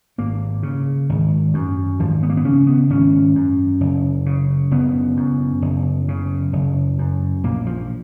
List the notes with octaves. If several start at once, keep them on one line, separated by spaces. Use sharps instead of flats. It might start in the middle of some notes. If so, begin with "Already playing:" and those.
G#1 A#3
C#3
G#1
F#2
G#1 F3
B3
A#3
B3
C#3 C#4
B3
G#1 C#4
F#2
F#1
C#3
F#1 B3
F#2
F#1
C#3
F#1
F#2
A#1 A#3
F3